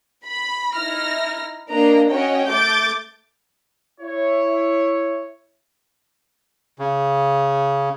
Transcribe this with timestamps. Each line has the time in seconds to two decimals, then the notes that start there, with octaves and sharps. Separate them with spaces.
0.24 B5
0.74 D#4 E4 F6 A#6
1.70 A#3 D4 D#5 A#5
2.10 C#4 F#4 C#5 D#5 G5
2.49 A3 D6 G6 A6 D7
4.01 E4 C#5
6.79 C#3